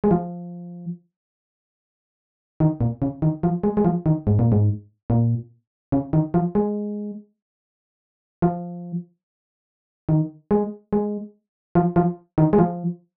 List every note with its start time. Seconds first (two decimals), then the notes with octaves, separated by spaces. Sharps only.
0.04 G#3
0.11 F3
2.60 D#3
2.81 A#2
3.02 C#3
3.22 D#3
3.43 F3
3.64 G#3
3.77 G#3
3.85 F3
4.06 D#3
4.27 G#2
4.39 A#2
4.52 G#2
5.10 A#2
5.92 C#3
6.13 D#3
6.34 F3
6.55 G#3
8.42 F3
10.09 D#3
10.51 G#3
10.93 G#3
11.75 F3
11.96 F3
12.38 D#3
12.53 G#3
12.59 F3